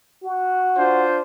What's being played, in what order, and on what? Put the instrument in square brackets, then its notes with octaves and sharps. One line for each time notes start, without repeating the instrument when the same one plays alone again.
[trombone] F#4
[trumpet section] D4 F4 C5